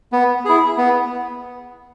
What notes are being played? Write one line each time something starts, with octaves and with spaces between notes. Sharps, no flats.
B3
E4 G#4
B3